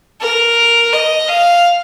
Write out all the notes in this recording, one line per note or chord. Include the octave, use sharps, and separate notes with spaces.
A#4
D#5
F5